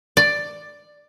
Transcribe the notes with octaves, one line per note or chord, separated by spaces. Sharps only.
D5